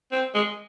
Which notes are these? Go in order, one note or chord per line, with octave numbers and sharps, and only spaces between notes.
C4
G#3